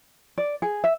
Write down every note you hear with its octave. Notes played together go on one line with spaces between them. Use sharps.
D5
G#4
E5